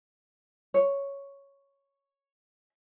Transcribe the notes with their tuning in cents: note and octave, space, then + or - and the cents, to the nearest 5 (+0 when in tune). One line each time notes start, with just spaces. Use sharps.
C#5 +0